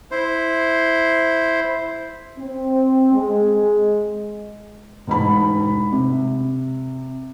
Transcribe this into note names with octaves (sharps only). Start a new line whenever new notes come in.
E4 C5
C4
G#3
E1 G#2 B5
C3